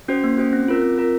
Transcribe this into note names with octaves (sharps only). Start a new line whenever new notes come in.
C#4 F#4 C5
A#3
C#4 F#4 C5
C4
F4 A#4
C4
F4 A#4